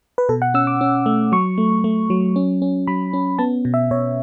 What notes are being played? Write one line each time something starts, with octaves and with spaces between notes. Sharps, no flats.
B4
B2 A4
F#5
C#4 E6
D6
C#4
A3
F#3 C#6
A3
A3
F#3
C#4
C#4
F#3 B5
C#4
B3 A5
B2
E5
B2 C#5